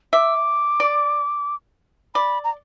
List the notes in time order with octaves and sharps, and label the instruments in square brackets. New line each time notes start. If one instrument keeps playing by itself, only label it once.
[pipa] E5 [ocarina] D6
[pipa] D5
[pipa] D5 [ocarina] B5
[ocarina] A#5